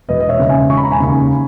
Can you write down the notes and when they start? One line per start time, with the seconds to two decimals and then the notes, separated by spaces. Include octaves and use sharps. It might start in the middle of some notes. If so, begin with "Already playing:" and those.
0.09 E1 B4 D#5
0.20 D#5
0.29 C#5 E5
0.39 D#2 C#3
0.49 E5 G#5
0.69 E1 C#6
0.77 B5
0.84 A#5
0.91 G#5 B5
1.00 D#2 C#3